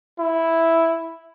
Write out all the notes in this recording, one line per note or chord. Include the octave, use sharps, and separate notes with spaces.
E4